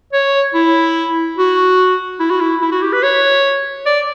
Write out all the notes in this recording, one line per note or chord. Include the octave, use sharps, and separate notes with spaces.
C#5
E4
F#4
E4
F#4
E4
E4
F#4
G4
B4
C#5
D5